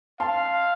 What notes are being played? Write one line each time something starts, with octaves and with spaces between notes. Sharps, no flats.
F5 A5 C6